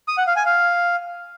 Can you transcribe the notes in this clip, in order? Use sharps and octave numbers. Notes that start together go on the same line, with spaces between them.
D#6
F#5
F5
G#5
F5